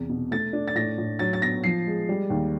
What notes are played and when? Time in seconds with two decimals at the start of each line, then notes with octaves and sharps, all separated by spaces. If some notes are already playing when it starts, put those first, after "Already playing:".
Already playing: E2 C3
0.09 B2
0.31 A3 A6
0.53 D4
0.68 A6
0.75 A2 A#6
0.98 A2
1.19 F#3 A6
1.33 A6
1.42 B3 A#6
1.64 F3 C7
1.87 G#3
2.09 G3
2.30 D#2